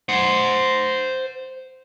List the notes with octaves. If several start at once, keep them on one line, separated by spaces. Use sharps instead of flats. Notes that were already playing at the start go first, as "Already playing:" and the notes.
C5 F#5